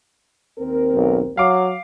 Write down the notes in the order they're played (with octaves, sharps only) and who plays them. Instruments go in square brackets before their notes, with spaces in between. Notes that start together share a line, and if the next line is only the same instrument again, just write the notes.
[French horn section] D#2 C4 A#4
[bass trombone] B1
[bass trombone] F#3 [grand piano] F5 D6